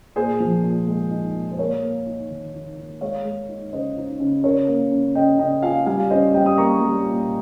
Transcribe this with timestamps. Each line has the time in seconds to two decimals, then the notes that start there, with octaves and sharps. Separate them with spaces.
0.16 A#2 G#4 C5
0.40 F3
0.64 A#2
0.87 G#3
1.11 D#4
1.35 A#2
1.52 C5
1.58 A#3 A#4 C#5
1.83 A#3
2.07 D#4
2.30 D#3
2.54 D#4
2.78 D#4
3.01 G#3 C#5 F5
3.25 G#3
3.49 D#4
3.73 C#3 C5 D#5
3.97 D#4
4.20 C#3
4.44 C#3 A#4 C#5
4.68 A#3
4.91 C#3
5.15 C#3 D#5 G5
5.39 C#3 D#5 G5
5.63 F4 F5 G#5
5.86 G3 F5 G#5
6.10 C#4 C5 D#5
6.34 G3 D#5 G5
6.46 D#6
6.58 A#3 A#5 C#6
6.82 G3
7.06 A#2